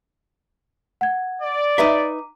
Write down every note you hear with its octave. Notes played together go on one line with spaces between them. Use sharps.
F#5 G#6
D5
D#4 B4 E5 A#5 D6 D#7